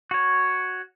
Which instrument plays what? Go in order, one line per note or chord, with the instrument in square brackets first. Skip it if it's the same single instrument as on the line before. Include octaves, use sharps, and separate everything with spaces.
[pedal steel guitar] F#4 C#5